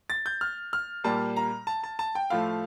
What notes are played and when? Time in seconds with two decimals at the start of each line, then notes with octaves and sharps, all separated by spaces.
0.10 A6
0.26 G6
0.41 F6
0.73 F6
1.04 A#2 G3 A#3 A5
1.37 A#5
1.67 A5
1.84 A5
1.99 A5
2.15 G5
2.30 A2 F3 A3 F5